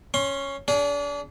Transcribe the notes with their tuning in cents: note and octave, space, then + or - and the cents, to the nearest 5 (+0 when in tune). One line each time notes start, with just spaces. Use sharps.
C#4 +0 C6 +30
D4 -35 G#4 +0